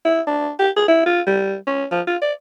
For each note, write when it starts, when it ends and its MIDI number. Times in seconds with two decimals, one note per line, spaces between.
0.05 0.21 64
0.27 0.51 62
0.60 0.70 67
0.77 0.87 68
0.88 1.04 64
1.06 1.21 65
1.27 1.56 55
1.67 1.86 61
1.92 2.01 53
2.07 2.17 65
2.22 2.33 74